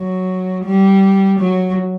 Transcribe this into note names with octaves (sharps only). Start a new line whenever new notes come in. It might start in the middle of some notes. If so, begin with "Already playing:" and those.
Already playing: F#3
G3
F#3